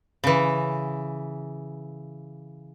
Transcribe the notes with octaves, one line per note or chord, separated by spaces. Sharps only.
C#3 E3